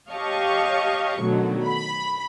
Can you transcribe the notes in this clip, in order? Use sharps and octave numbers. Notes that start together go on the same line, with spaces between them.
G4 C#5 D#5 F5 A5 C#6
B2 D3 D#3 F#3 A3
B5